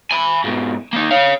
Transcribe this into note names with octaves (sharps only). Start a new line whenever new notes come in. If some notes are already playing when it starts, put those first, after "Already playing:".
G#5 B5
G#2 B2
A#3 D#4
C#5 F5